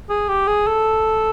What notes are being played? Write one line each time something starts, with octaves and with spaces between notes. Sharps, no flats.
G#4
G4
G#4
A4